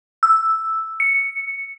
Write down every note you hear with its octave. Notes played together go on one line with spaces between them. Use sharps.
E6
C#7